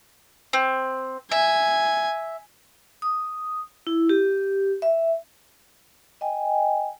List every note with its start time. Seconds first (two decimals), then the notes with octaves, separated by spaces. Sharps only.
0.53 C4
1.31 E5 G#5
3.02 D#6
3.87 E4
4.09 G4
4.82 E5
6.21 D#5 G5 G#5